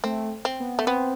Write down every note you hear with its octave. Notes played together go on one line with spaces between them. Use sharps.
A3 C4
C4
B3
A3
B3 C4